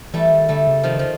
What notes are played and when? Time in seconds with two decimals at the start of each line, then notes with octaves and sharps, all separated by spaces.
0.14 E3 G3 A3
0.31 D#3
0.49 D3 G3 A3
0.67 C#3
0.83 C3 D#3 F3
0.95 C#3 F3